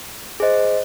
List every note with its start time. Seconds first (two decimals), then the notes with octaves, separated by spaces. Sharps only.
0.40 G#4 C5 D#5